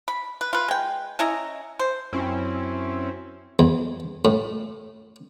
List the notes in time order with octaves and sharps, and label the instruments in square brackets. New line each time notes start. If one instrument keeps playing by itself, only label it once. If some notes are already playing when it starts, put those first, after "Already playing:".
[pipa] B5
B4
F4 B4
G#3 G5
C#4 E4 D#5 A#5
C5
[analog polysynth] F#2 C4 C#4 E4
[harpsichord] E2
A2